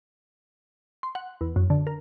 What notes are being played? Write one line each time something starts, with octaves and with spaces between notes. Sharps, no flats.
C6
F#5
E2
F#2
D3
A#4